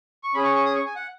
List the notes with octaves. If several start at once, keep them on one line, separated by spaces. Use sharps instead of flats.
C#6
C#4 G#4 B5
C#6
C#6
D#6
C#6
G#5
F#5